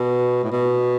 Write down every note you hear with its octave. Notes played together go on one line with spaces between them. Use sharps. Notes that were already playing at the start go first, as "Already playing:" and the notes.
Already playing: B2
A2
B2